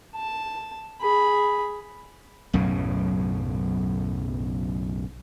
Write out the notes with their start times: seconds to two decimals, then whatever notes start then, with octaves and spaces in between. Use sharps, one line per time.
0.16 A5
1.01 G#4 B5
2.53 B1 F#2 A2 C#3